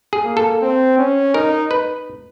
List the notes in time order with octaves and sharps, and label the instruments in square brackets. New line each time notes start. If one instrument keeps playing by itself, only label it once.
[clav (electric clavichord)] G#4
[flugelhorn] A#3
[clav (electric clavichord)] A4
[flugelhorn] C4
C#4
[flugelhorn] D#4 [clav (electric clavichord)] A#4
[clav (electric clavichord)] B4